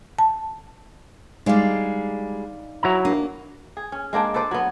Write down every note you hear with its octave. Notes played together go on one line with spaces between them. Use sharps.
A5
G3 G#3 D#4 D5 F5
F#3 E4 A#5
A#3 D4
G#4
C#4
G#3 A#3 D4 G5
A4 B4 C5 D5
F#3 B3